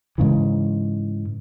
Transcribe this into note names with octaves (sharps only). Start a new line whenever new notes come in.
G#2 C#3 E3